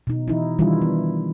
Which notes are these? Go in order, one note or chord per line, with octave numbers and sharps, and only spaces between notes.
B2 D#4
E3 D#4 E4
D#3 E3 G3 D4 E4 F4
B3